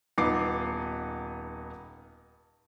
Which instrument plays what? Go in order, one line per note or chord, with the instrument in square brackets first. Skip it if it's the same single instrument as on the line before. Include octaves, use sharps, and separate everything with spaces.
[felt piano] D#1 B3 D#4 D6 C7